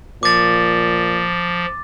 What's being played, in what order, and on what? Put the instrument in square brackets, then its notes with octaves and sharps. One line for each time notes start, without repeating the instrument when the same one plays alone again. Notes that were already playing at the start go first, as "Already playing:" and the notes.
[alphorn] A#2 [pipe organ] F3 [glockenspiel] D6 A6